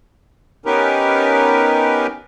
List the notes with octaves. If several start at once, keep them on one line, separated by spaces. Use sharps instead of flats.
B3 C#4 D#4 G4 A#4 B4